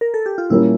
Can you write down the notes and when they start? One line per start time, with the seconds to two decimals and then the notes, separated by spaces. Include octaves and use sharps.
0.01 A#4
0.14 A4
0.26 G4
0.38 F4
0.50 A#2 G3 A#3 C#4 E4